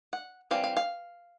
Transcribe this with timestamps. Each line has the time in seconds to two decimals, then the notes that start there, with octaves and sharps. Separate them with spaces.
0.13 F#5
0.51 E3 G3 C4 F5
0.64 F5
0.77 F5